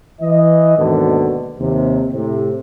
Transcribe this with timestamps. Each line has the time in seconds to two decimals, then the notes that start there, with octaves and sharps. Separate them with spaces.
0.21 E3 D#5
0.78 D#2 G#2 B2 D3 D#3
1.59 D#2 C3
2.12 A2 C3